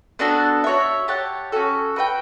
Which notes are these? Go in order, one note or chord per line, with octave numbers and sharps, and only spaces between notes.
B3 D4 F#4 A4
F#4 C#5 E5
G4 C#5 F#5 A5
C#4 F#4 A4
F#4 B4 E5 G5